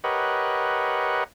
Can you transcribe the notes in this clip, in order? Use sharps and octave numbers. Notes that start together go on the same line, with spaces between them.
G4 A#4 B4 C#5 D#5 F#5